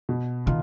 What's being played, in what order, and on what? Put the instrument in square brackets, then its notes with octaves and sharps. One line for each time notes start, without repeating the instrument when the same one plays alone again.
[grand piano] B2
[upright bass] D#3 [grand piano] F4